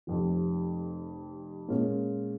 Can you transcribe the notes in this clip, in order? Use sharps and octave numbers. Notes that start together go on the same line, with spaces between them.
F1 F2 C3
A#2 G#3 C#4